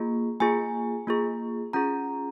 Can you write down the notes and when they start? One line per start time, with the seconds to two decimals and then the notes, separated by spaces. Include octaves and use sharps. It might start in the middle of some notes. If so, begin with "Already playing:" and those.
Already playing: A#3 F4 G#4
0.40 A#3 F4 G#4 G#5
1.07 A#3 F4 G#4
1.73 C#4 F4 G#4 A#5